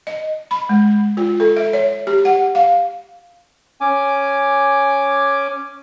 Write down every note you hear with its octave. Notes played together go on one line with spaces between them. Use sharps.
D#5
B5
G#3
F4
A4
E5
C#5
G4
F#5
F5
C#4 G#5 D6